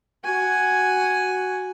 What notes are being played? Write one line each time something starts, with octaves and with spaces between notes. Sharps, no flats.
F#4 G#5